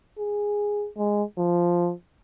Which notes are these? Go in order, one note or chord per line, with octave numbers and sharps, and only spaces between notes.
G#4
G#3
F3